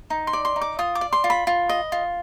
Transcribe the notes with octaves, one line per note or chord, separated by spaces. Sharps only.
D#4
C6
D5
C6
D#4
D6
F4 D#6
D6
D5
C6
F4
B5
F4
D#5
F4